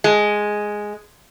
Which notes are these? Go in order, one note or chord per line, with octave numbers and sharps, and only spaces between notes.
G#3